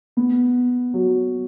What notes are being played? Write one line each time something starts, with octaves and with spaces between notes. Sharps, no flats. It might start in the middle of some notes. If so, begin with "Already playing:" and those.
B3
F#3